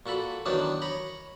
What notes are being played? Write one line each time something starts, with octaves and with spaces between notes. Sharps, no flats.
A#2 F#4 A4 B5
D#3 E3 F#3 B3 D4 D#4
C#5 A#5 B5